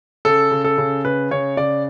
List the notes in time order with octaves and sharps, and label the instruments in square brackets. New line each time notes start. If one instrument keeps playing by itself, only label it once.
[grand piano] C#3 A4
C#3
A4
C#3
C#3 B4
C#3 C#5
C#3 D5